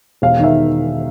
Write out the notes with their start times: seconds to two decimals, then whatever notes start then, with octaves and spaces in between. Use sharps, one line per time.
0.22 E1 F5
0.39 D#3 E5